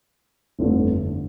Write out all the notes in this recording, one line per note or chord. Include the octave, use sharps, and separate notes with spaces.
G1 F2 D3 F3 A3